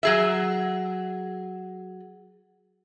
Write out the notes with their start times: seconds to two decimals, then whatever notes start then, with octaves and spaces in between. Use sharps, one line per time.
0.03 F#3 G#4 E5